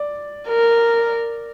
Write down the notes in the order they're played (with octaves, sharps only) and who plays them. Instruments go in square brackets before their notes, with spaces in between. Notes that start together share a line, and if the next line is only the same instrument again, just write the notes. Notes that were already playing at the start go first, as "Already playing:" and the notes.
Already playing: [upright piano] D5
[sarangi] A#4